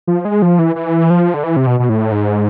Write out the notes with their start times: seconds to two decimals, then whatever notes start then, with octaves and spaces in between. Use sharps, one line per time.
0.07 F3
0.25 G#3
0.42 F3
0.59 E3
0.76 E3
1.10 F3
1.34 D3
1.44 E3
1.57 C3
1.67 B2
1.80 B2
1.89 A2
2.12 G#2